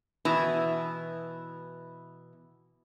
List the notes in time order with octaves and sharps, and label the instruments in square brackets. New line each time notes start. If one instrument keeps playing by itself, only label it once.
[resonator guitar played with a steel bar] B2 E3 E4